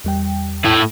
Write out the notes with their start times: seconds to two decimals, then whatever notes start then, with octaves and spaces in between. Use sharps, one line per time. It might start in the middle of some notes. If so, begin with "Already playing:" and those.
0.04 E2 G3 G5
0.65 A2 E4